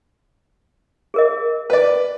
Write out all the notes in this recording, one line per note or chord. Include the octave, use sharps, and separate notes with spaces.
G#4 A#4 D#5
B4 D5